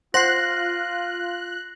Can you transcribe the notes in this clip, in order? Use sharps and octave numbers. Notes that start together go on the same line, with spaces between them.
F4 C5 F#5 F#6 A#6 C7